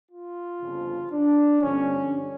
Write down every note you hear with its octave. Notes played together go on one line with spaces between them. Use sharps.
F4
G1 F2 C#3 F3
D4
G1 G2 D3 F3 C#4